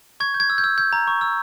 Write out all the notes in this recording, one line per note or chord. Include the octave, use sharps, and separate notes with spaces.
C#6 G#6
G6
G#6
E6
G6
E6
G6
A#5
C#6
E6